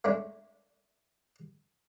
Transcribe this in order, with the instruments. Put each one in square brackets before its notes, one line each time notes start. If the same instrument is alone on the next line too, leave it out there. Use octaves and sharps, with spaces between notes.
[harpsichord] G#3 A3 C#4 D4